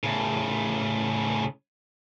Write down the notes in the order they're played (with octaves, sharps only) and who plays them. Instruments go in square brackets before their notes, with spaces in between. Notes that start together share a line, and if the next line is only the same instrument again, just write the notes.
[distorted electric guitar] A2 C#3